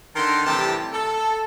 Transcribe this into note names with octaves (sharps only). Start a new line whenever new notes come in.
D3 D#3 A#4 A5 C6
A2 C3 E3 G3 G4 A5
A4